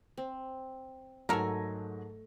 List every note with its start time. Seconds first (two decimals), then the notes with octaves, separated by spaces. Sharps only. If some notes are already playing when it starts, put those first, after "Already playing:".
0.18 C4
1.29 G#2 F#3 A3 A4 A#4 G#5 A#5 A#6